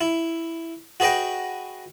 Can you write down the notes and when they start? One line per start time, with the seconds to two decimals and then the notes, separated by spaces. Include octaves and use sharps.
0.01 E4
1.00 F#4 G#4 B4 D#5 G5